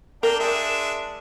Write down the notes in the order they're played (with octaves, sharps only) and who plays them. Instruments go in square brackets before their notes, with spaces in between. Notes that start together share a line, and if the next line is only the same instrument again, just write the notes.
[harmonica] A#3 D4 G5 [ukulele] A#4
[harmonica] G#3 D4 E5